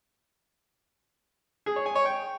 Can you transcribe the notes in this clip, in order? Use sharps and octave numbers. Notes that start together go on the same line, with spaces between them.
G#4
C#5
G#5
C#5
G5